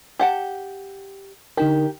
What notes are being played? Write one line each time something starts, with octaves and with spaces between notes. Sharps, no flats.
G4 F#5 A5
D3 D#4 G4 A#4